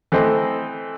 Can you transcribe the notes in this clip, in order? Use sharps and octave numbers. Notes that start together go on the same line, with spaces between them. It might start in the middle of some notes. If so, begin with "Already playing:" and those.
E3 A3 C4 A4 C5 D#5